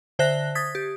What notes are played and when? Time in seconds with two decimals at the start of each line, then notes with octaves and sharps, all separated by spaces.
0.19 D3 C5 E5 F#6 A#6
0.55 D#6 G#6 A6 B6
0.75 G4